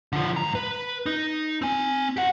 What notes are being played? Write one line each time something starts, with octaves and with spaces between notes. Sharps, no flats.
D3 F3
G#2 A#5
B4
D#4
C4 G#5
G4 F#5